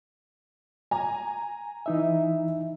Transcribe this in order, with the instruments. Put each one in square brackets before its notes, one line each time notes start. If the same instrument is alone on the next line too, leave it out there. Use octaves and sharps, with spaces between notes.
[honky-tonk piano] G#5 A#5
[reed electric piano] E3 D#4 E5